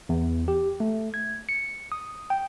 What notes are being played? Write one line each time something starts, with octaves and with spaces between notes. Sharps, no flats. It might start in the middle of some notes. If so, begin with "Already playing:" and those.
E2
G4
A3
G#6
C#7
D#6
G5